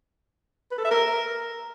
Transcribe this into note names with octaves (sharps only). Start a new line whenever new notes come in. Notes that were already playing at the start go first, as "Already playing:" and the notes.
B4
A4
E5
A#4